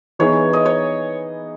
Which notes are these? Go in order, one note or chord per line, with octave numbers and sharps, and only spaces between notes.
E3 B3 D#4 G#4 C#5
D#5
C#5